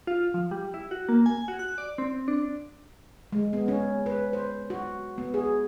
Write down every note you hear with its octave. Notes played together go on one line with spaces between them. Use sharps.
F4
F3
G3
E4
F#4
A#3
G#5
F#4
F#6
D5
C4
D4
G#3
B3
C#4
B4
C5
F#4
B3
G#4